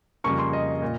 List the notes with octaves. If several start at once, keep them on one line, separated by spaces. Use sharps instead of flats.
F2 C#3 G3 A#3 C#6
C6
D#5
A#2